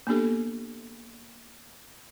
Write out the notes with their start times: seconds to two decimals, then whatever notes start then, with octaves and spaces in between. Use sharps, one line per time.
0.07 A#3 B3 D4 G4 A4